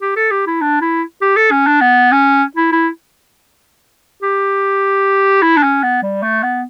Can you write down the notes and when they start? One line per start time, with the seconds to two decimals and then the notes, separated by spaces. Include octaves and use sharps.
0.01 G4
0.16 A4
0.31 G4
0.47 E4
0.61 D4
0.81 E4
1.21 G4
1.36 A4
1.51 C#4
1.66 D4
1.81 B3
2.12 C#4
2.56 E4
2.72 E4
4.22 G4
5.42 E4
5.57 D4
5.63 C#4
5.83 B3
6.02 G3
6.23 A3
6.43 B3